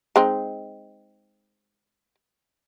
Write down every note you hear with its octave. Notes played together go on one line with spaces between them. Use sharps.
G#3 C4 D#4